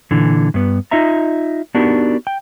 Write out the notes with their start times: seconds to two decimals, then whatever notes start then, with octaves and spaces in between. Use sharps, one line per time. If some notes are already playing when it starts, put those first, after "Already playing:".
0.11 A#2 D3 E3
0.54 G2 B3
0.91 D#4 F4 D#5 E5 A#5
1.75 B3 D4 D#4 F#4 G4 A#4
2.27 G5